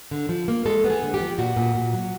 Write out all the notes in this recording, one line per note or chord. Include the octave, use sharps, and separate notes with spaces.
D3
F3
A#3
G#3 A4
B3
G#4
D3
G4
F3
A#2 F#4
A#2
A#2
F#3